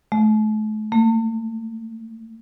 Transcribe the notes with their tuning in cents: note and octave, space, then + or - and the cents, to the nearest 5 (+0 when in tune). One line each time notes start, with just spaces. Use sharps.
A3 -40
A3 +40